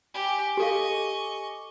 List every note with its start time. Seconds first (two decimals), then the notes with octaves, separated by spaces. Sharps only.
0.14 G4 G#5 D6
0.57 G4 A4 D#5 F5 C#6